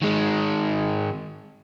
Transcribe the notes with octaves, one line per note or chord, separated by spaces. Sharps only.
D#3 G#3